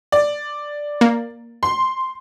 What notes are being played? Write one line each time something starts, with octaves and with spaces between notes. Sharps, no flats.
D5
A#3
C6